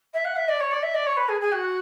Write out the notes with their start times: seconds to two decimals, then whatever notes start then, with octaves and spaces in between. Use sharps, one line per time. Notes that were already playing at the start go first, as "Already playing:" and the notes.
0.13 E5
0.24 F#5
0.36 E5
0.48 D5
0.60 C#5
0.71 D5
0.82 E5
0.94 D5
1.06 C#5
1.16 B4
1.28 G#4
1.41 G#4
1.52 F#4